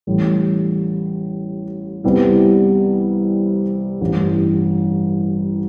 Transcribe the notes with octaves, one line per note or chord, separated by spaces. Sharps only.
A1 A2 G3
C2 C3 G3 B3 E4
A1 G2 E3